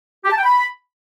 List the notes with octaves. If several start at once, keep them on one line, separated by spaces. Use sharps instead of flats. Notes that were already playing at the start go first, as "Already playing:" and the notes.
G4
A5
G5
B5